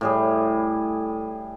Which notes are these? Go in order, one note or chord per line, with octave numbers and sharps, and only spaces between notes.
A2 G3 G#4